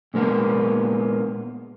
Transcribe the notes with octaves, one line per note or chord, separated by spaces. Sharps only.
A#2 G#3 A#3 B3